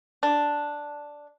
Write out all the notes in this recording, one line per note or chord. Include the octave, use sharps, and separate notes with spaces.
D4